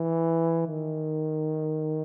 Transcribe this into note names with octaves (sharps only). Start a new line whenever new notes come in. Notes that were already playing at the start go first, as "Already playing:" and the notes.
Already playing: E3
D#3